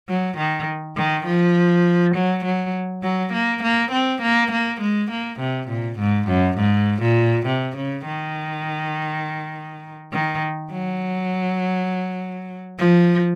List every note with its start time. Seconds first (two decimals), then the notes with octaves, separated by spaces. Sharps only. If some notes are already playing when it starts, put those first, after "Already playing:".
0.09 F#3
0.37 D#3
0.96 D#3
1.26 F3
2.15 F#3
2.45 F#3
3.03 F#3
3.33 A#3
3.63 A#3
3.92 C4
4.22 A#3
4.52 A#3
4.81 G#3
5.11 A#3
5.40 C3
5.69 A#2
5.99 G#2
6.28 F#2
6.58 G#2
7.02 A#2
7.46 C3
7.76 C#3
8.06 D#3
10.13 D#3
10.71 F#3
12.79 F3